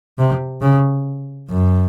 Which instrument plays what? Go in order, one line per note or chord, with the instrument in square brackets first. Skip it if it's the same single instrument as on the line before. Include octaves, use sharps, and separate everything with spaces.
[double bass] C3
C#3
F#2